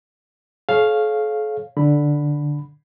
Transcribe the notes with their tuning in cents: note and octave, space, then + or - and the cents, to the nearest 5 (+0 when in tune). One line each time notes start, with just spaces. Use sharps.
A4 -45 C#5 -10 F5 +0
D3 +0 B5 +0